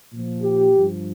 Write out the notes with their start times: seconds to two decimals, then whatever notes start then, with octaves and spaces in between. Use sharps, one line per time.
0.12 A#2 F3
0.41 G4
0.73 G2 F3